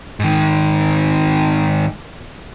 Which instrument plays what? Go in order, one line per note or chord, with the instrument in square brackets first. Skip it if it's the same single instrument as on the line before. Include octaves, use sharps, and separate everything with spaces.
[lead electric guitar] G#2 D#3